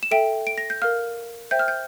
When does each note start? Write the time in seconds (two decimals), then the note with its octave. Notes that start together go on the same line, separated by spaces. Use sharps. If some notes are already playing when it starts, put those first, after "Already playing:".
0.03 E7
0.11 A4 E5 G5 D7
0.47 D7
0.58 A#6
0.70 G6
0.82 A#4 F5 F6
1.51 C5 E5 G5 G6
1.59 F6
1.68 G6